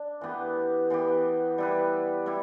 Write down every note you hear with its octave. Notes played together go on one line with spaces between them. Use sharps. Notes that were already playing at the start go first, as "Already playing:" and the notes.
Already playing: D4
E3 B3 G4
E3 B3 G4
G3 E4 G4 B4
G3 E4 G4